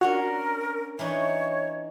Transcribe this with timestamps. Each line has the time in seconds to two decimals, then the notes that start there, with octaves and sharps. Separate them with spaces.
0.01 C#4 D4 F#4 A#4 C#5
0.99 E3 D4 D#4 C#5